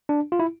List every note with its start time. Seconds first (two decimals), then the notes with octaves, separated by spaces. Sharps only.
0.09 D4
0.32 F4
0.40 E4